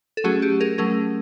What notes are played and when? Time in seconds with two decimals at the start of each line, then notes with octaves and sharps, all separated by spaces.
0.17 A4
0.24 F#3 A3 C#4 F#4 G#4
0.42 G4
0.60 G#4 A#4
0.78 F#3 A3 C#4 G#4 A#4